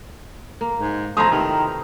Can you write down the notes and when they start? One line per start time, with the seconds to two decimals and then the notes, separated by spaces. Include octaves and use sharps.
0.61 A#3
0.78 G#2
1.17 F3 A3 E4 A#5 D#6
1.32 C3 D#3 C4 B4